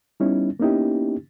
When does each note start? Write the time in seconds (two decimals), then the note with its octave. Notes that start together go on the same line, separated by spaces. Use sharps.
0.20 G3 B3 C#4 D#4 E4
0.60 A#3 B3 C#4 D#4 E4 G4